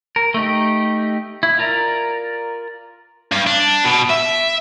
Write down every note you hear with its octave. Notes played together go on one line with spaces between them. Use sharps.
A#4
A3 D#4 G4
E4
F4 A#4 D5 A#5
G2
D4
B2
E5